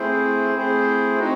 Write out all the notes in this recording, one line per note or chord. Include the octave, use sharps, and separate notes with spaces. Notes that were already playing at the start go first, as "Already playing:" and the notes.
Already playing: A3 C4 E4 G#4 C5
A3 C4 E4 G#4 C5
C4 D#4 F#4